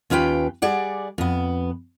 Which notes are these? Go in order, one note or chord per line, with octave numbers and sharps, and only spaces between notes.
D#2 C#4 F4 B4 G5
G3 G#4 D5 F#5
F2 B3